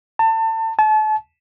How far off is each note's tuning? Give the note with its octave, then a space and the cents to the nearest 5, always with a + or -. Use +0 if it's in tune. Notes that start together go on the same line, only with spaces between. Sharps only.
A5 +30
A5 -35